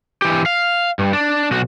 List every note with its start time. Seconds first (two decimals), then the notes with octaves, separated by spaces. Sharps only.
0.22 E3 G4
0.46 F5
0.99 G2
1.13 D4
1.51 B1 F#4